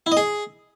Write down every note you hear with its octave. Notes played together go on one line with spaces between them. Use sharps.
E4
D#5
G#4